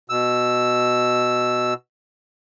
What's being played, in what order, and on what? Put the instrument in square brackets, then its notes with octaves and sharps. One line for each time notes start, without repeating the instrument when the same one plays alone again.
[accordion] B2 E6